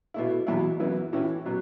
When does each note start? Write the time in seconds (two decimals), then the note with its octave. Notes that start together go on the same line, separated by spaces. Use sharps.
0.14 B2 A3 E4
0.47 E2 B2 F#3 B3 E4
0.80 F#2 E3 B3 E4
1.13 A2 E3 C#4 E4
1.45 B2 F#3 B3